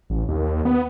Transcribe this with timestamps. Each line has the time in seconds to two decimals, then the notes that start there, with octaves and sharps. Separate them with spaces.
0.10 A1
0.28 D#2
0.65 B3